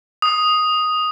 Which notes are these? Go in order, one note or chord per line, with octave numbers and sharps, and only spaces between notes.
D#6